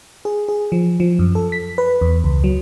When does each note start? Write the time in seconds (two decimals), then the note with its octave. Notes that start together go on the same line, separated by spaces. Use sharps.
0.25 G#4
0.49 G#4
0.72 F3
1.00 F3
1.19 F#2
1.35 A4
1.52 B6
1.78 B4
2.01 E2
2.24 C#2
2.44 F#3